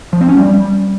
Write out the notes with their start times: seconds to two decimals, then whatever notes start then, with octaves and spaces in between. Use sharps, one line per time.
0.13 F3
0.21 C4
0.29 C#4
0.37 G3